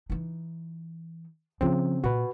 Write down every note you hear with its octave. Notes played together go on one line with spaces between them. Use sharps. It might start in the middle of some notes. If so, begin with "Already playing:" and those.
E3 D#4
C#3 F3 C4 F4
A#2 F#4 B4